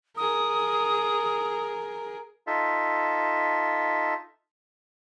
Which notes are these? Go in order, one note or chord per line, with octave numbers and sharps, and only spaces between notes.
G#4 A#4 D#6
D#4 F4 A4 E5